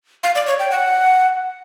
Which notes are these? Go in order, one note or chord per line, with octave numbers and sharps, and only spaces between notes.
F5
D5
C#5
G5
F#5